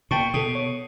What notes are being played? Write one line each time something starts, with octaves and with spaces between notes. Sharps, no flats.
A#2 G5 A5 C#6
B2 A4 D#6
C#5